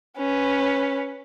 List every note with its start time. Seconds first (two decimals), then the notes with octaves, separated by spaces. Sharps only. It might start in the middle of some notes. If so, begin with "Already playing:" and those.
0.17 C#4 B4